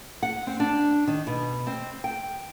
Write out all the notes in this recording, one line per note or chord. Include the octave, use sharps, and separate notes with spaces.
F#5
C4
D4
D#3
B2
C4
G5